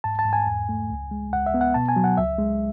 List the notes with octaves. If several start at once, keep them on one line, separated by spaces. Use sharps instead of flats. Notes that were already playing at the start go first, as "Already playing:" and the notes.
G#2 A5
A5
G#2
G#5
E2
A3
C#2
G#3
C#2 F#5
E5
B3
F#5
B2 A5
G#5
F#3
F#5
C#2 E5
G#3